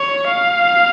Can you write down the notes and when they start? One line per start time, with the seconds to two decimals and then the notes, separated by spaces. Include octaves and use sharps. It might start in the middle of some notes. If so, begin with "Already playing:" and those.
Already playing: C#5
0.30 F5